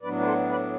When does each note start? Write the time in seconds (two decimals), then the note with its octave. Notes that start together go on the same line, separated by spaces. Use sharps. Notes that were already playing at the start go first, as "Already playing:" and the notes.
0.02 A2 F#3 B3 D4 B4 D5
0.20 B4
0.26 A4 C5
0.49 B4 D5